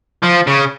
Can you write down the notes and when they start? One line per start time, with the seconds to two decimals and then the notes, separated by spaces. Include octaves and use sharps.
0.23 F3
0.47 C#3